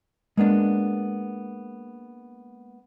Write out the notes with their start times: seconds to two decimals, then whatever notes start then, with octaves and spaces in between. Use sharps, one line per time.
0.37 G#3 A#3 B3 D4